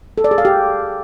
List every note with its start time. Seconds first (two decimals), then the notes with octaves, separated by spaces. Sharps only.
0.18 A4
0.24 D5
0.31 G#4
0.38 F5
0.45 G4